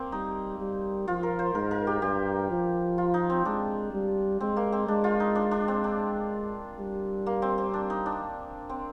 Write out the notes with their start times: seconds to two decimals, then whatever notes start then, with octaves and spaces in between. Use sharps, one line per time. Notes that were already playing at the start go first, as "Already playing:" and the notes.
Already playing: A#3 C4
0.12 G3 D#4
0.59 G3
1.08 F3 F4
1.23 A#4
1.39 C5
1.55 G#2 A#4
1.71 A#4
1.87 G4
2.02 G2 G4
2.50 F3
2.98 F4
3.14 D#4
3.30 C4
3.45 G#3 D4
3.93 G3
4.41 G#3 C4
4.56 A#3
4.72 C4
4.88 G#3 D4
5.04 F4
5.20 D#4
5.35 D4
5.51 D4
5.68 C4
5.84 D4
6.79 G3
7.26 A#3
7.42 C4
7.58 C4
7.74 D4
7.90 D#4
8.06 D4
8.69 C4